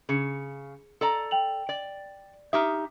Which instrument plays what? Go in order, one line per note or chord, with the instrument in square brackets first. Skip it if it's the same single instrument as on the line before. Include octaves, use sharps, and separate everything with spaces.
[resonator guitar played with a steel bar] C#3 [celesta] G#4 C#7
[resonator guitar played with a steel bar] A4 D5 A#5
[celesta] G5 F7 F#7
[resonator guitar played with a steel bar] D5
[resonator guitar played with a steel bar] D#4 G4 E5 [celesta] D#6 F6